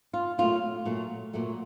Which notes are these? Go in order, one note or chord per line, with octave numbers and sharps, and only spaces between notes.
F4
A#2 F#3 A3 F4
A#2 F#3 A3
A#2 F#3 A3